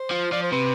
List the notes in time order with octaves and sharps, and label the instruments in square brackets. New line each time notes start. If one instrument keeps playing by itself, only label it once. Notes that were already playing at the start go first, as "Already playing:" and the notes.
Already playing: [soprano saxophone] C5
[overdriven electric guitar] F3
[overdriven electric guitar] F3 [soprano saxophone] D5
[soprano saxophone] C5
[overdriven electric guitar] C3 [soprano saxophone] B4